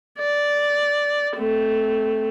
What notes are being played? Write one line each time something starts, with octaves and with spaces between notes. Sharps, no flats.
D5
A3 C4